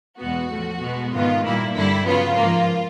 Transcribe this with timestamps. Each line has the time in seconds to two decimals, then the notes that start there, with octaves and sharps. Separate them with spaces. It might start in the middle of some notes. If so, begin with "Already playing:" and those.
0.19 E2 B2 G#3 B3 F#4
0.50 A2 F3 A3
0.82 B2 G#3 B3
1.12 G#2 D#3 G#3 B3 F4
1.44 A#2 G3 A#3 E4
1.74 G2 D3 G3 E4
2.06 C#3 F#3 B3 F4
2.37 G#2 F3 A#3